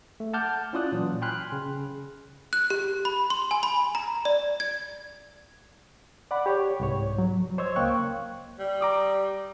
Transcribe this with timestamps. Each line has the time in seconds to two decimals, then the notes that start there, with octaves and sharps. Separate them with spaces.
0.20 A3
0.33 F#5 A5 D6 F6 G6
0.73 C#4 E4 F4 D5 D#6 F#6
0.92 A#2 E3 F#3
1.22 G5 G#5 B5 C6 F6 F#6
1.52 C#3
2.53 F#6
2.70 G4
3.05 B5
3.30 C6
3.51 G#5
3.63 B5
3.95 A#5
4.25 D5
4.60 G#6
6.31 D5 F#5 B5
6.46 G4 C#5
6.80 C2 G#2 C#5
7.18 F#3
7.58 C5 C#5 D#5 E6 G#6
7.76 C#2 A#3 F5 G5 C#6 F#6
8.59 G3
8.81 A#5 D6 D#6